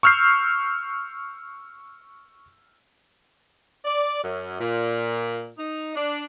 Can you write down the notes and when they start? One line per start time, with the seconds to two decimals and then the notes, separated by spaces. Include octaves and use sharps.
0.03 C#6 E6 F6 G6 C7
3.84 D5
4.22 F#2
4.59 A#2
5.58 D#4
5.95 D4